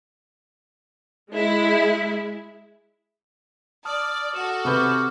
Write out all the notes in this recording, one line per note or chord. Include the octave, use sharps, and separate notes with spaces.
G#3 E4
D5 A5 D#6 F6
F#4 A4 E7
C3 B4 C#6 D6 F6 G6